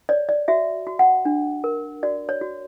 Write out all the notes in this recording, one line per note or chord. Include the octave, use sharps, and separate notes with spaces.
C#5 D5
D5
F#4 E5
F#4
F#5
D4
A#4
F#4 D5
C#5
F#4